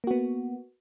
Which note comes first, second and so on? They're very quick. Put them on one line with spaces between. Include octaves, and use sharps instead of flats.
A#3 F#4 B3